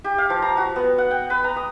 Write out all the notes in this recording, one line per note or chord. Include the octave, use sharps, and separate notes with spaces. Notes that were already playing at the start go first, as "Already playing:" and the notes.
G4
F5
F3
A#5
F#4
B3
F#5
G5
B4
A#5
D#6